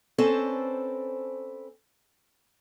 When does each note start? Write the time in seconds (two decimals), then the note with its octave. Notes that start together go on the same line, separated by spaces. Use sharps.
0.18 C4 C#4 A4 B4 C5 D5